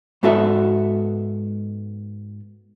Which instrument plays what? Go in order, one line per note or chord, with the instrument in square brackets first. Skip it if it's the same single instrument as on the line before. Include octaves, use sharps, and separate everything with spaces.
[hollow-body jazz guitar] G#2 B3 F#4 A4 E5